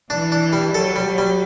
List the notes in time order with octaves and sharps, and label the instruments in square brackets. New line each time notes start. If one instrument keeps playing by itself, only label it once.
[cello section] E3 [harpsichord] D4
[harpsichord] D4
G3
[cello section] F#3 [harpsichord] A4
[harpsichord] G3
[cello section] F#3
[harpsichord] G3